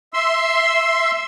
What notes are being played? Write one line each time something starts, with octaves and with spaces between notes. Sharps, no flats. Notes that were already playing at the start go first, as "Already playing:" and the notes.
E5 C6 E6